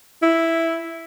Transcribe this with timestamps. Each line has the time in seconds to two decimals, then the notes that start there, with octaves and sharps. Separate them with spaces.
0.23 E4